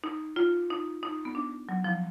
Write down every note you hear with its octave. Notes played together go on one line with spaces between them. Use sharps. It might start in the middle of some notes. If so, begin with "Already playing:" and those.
D#4
F4
D#4
D#4
B3
D4
F#3
F3